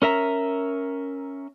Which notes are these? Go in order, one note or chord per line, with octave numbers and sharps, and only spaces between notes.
C#4 A#4 E5 A#5